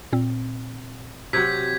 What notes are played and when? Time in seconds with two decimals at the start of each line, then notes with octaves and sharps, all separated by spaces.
0.12 A#2 C4
1.33 C3 F#3 G6 G#6 B6